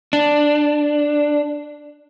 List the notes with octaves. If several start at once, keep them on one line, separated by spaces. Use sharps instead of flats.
D4